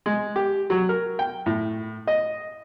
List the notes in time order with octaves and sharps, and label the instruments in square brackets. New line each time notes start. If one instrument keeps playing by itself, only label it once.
[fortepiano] G#3
G4
F#3
A#4
G5
A2
D#5